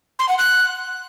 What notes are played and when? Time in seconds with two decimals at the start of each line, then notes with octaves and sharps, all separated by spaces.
0.19 C6
0.29 F#5
0.39 F#6